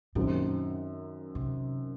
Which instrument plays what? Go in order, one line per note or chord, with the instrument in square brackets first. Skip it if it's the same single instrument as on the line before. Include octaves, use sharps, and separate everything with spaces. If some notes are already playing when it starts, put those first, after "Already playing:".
[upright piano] F#2 D#3 F#3 C4 [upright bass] A#2
[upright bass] C3